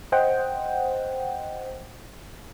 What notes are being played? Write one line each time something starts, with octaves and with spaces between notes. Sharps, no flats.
C5 D#5 F#5 G5